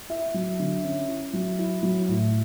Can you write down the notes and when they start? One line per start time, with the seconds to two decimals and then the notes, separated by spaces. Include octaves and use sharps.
0.09 E4 E5
0.34 F#3
0.59 D3
0.84 C#4
1.08 E4
1.33 F#3
1.59 E4
1.83 F#3
2.08 A2